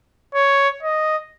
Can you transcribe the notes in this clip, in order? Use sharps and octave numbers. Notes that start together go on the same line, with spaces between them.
C#5
D#5